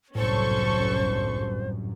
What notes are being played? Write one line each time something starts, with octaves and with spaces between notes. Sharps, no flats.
G1 C2 F#2 A2 C#4 A4 C5 C#6